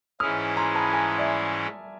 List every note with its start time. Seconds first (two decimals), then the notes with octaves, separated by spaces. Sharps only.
0.20 G#2 E3 G#3 C#4 E4 D#6 F6
0.57 A#5 C6
0.75 A5 B5
0.93 G#5 A#5
1.18 D5 E5